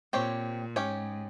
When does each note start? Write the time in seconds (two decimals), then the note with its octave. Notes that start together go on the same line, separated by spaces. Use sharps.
0.13 A#2 C4 G4 C#5
0.76 G#2 C#4 G4 C#5